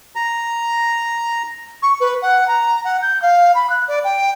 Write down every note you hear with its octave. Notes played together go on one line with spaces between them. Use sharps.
A#5
C#6
B4
F#5
A#5
F#5
G6
F5
B5
F#6
D5
G5